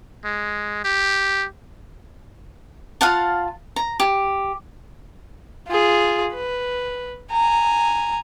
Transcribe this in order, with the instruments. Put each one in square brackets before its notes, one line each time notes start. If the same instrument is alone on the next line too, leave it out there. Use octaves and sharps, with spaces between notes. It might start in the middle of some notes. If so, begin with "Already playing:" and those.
[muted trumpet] G#3
G4
[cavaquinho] F4 F5 F#5 A5
A#5
G4
[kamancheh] F4 G#4
B4
G#5 A#5